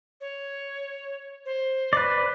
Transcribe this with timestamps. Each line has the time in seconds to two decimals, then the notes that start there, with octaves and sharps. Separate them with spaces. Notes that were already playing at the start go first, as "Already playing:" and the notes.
0.21 C#5
1.45 C5
1.93 B4 D5